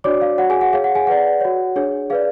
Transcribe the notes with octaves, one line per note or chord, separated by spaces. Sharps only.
D4 F#4 C#5 D5 D6
F5
F#4 C#5 F#5
G#4 G#5
F#5
G#4 C#5 F5
F#5
G#4 G#5
G#4 B4 D5 F#5
F#4 C#5
D4 G#4 C#5
G#4 B4 D5 F5